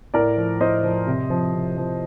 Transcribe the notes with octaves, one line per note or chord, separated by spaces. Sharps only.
A2 A#4 D5
F3
A2 C5 D#5
F3
C3
F3
C3
F3